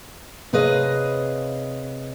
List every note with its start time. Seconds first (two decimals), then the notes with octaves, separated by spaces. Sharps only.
0.53 C3 G#4 B4 C#5 D#5 F5